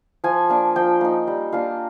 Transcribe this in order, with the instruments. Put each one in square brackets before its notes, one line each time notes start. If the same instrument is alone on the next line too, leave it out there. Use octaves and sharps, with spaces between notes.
[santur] F3 G#5
A#3 D4
F3 G5
A#3 D#4
G3
A#3 D4 F4